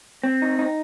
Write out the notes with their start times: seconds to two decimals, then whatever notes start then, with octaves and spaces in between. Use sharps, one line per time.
0.24 C4
0.42 D#4
0.59 D#4